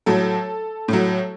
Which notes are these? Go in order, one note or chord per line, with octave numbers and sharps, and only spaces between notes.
A2 F#3 A4
A2 F#3